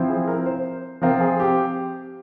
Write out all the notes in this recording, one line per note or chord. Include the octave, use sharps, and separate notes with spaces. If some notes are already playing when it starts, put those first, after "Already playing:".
Already playing: F3 C4 E4
G#4
A#4
C5
F3 C4 F4 A#4
G#4
G4